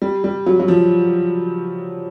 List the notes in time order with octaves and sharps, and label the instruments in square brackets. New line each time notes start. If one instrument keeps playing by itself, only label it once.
[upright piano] G3
G3
F#3
F#3
F3